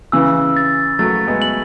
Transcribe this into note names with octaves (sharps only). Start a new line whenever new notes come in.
C#3 E3 E6
A6
F#3 A3 A6
G#3 B3
F#7